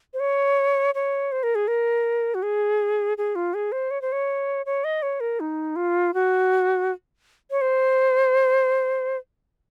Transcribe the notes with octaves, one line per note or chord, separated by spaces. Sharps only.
C5
C#5
C#5
C5
A#4
G#4
A#4
F#4
G#4
G#4
F4
G#4
C5
C#5
C5
C#5
C#5
D#5
C#5
A#4
D#4
F4
F#4
C#5
C5